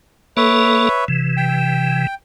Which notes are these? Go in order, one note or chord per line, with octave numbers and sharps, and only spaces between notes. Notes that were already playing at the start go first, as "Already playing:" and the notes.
A#3 A4 B4 C#5 E5
C3 E3
G5